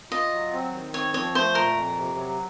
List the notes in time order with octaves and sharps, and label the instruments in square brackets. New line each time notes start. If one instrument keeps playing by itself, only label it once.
[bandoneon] F4 [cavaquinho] D#5
[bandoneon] F#3
C4
D#3
[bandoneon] C4 [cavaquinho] C#5
[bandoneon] F3 [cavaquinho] C#5
[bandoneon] A3 [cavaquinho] C5
[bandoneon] A#2 [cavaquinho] A#4
[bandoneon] F2
C3
F#3